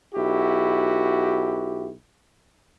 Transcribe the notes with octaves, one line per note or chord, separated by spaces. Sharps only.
B1 E4 F#4 G4